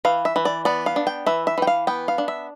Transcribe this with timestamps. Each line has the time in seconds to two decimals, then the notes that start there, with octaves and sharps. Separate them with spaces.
0.05 E3 F5
0.25 E5
0.36 E3
0.45 D5
0.65 B3 D5
0.86 F5
0.96 D4
1.07 G5
1.26 E3 E5
1.47 E5
1.58 E3 G5
1.67 F5
1.87 B3 G5
2.08 F5
2.18 D4
2.28 E5